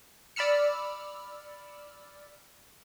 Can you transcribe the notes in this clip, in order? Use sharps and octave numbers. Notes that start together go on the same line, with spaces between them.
D5 B5 E6 F6 C#7